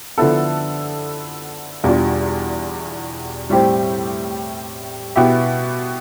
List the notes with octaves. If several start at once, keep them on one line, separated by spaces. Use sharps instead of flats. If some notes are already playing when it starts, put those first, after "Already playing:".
D3 F3 B3 E4 A4
E2 B2 G3 D4 F4
A2 G3 C4 G4
B2 B3 E4 G4